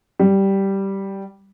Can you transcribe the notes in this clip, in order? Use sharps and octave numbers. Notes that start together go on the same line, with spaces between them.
G3